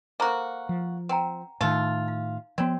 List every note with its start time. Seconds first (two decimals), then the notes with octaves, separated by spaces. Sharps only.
0.20 A#3 F#4 A4 C5 A#5
0.69 F3
1.09 C4 F#5 G5 A#5
1.61 A2 D#3 A3 D#4 F4
2.08 F5
2.58 F3 B3 C4 F#4 C#5 D5